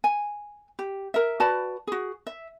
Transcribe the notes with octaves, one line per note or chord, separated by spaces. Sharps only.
G#5
G4
A#4 E5
F#4 B4 D5 A5
F#4 G#4
E5